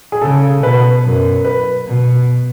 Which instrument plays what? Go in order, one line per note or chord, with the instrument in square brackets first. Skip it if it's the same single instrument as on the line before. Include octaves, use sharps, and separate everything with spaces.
[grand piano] G#4
[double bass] C#3 [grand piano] A4
[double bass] B2 [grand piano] B4
[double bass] F#2
[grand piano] B4
[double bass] B2